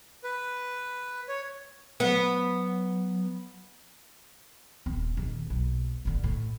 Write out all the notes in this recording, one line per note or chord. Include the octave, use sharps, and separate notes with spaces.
B4
C#5
F#3 B3
D#1 C4
D#1 D#3
F#1 B1
A1 D3
A2